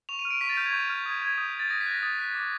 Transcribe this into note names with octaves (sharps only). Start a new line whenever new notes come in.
C#6 F7
D#7
F6
D7
C#6 B6
A6
F6 G6
G#6
C#6 G6
F6
D#6 G#6
G6 G#6
D#6 G6
G6
A6
D#6 A#6
B6
F#6 A#6
D#6 A6
F#6 B6
D6